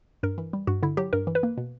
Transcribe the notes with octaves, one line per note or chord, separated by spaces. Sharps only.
G2 A#4
E3
G3
G2 F#4
D3 E4
F#3 G4
G2 A#4
E3
B4
A#3
B2